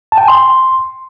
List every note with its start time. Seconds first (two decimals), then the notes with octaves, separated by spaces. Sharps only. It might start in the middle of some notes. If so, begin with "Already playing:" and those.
0.12 A5
0.18 G5
0.23 G#5
0.28 C6